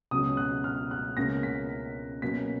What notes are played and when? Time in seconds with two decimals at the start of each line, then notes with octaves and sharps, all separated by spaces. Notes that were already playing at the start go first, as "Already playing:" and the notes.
0.11 C#2 B2 F#3 C#4 D#6
0.37 F#6
0.64 F6
0.91 F#6
1.17 C#2 B2 A#3 C#4 A#6
1.43 B6
2.22 B2 F#3 A#3 C#4 B6